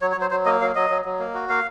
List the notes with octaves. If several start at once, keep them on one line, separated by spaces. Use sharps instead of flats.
F#3 C#5
C#5
F#3 C5
F#3 C5
A#3 D#5
F#3 F5
F#3 D#5
F#3
F#3
A#3
F#4
A#3 F5